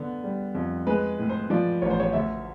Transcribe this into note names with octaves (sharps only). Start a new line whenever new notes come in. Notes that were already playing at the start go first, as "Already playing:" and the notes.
Already playing: D3 B3
G3
F2
G#3 B4
A2
C5
F3 D5
A1 C#5
C5
C#5
D2 E5